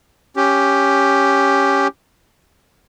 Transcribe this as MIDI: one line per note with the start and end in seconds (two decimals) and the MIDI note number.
0.36 1.87 61
0.36 1.87 67